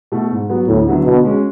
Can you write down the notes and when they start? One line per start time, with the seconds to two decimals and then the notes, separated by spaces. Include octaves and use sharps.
0.12 B2 A3 E4
0.31 G#2
0.50 F#3 B3 F#4
0.68 D2 A2
0.87 D3 F#3 B3 E4
1.05 B2 D3
1.24 G#3 C#4 F#4